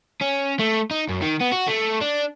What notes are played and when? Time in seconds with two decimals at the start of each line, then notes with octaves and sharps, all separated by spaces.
0.21 C#4
0.59 A3
0.91 D#4
1.09 F#2
1.22 D#3
1.41 B3
1.53 F#4
1.68 A3
2.01 D4